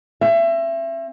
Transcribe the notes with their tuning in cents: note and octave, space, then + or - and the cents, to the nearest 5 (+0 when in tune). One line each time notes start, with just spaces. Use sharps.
C4 +45 E5 +25